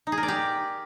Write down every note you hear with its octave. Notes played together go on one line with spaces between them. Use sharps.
D#4
G#4
A#4
D5
G4